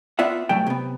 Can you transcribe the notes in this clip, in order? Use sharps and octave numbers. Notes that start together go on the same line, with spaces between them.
B3 F4 D5 E5 F#5
B1 G2 F#3 A3 G5
C3 B3